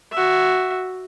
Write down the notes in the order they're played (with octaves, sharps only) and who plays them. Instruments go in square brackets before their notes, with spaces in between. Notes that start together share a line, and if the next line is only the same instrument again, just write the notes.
[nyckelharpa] F#4 E5